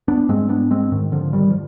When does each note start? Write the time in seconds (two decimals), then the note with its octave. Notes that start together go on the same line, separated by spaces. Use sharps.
0.08 B3 D4
0.29 G#2 G#3 C4
0.49 B3 D4
0.71 G#3 C4
0.92 G#2 D#3
1.12 D3 F3
1.33 D#3 G3
1.50 F3